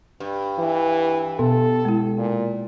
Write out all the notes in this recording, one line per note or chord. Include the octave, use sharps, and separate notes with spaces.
G2
E3
B2 B3 A4
G#3 E4
A#2